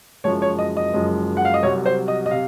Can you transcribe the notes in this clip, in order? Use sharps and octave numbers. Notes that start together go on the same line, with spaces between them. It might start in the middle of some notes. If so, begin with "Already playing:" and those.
F#1 F#2 F3 G#3 C#5
C#5
D#5
D#5
F#1 F#2 F3 G#3
F#5
F5
D#5
C2 C3 F#3 C#5
C5
D#5
D#5
C3 F5